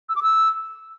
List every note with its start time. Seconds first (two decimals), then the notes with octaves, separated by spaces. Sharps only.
0.09 E6
0.16 D6
0.22 E6